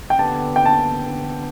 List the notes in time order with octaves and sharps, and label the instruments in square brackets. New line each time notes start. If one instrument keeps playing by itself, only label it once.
[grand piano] G5
[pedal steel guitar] D3 B3 G4 [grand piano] A5
[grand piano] G5
A5